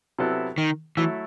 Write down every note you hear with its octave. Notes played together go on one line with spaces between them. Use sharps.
C3 F#3 B3 E4 A4
D#3
E3 F#3 A3 E4 A4